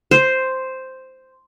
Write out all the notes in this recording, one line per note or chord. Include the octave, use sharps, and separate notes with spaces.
C5